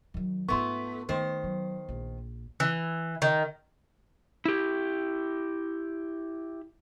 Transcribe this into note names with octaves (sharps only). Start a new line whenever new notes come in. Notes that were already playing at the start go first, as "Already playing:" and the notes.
D#3 F#3
G#2 A3 B3 F4 C6 C#6
D#3 A3 B3 C5
F#3
A#1
E3
D#3
E4 G4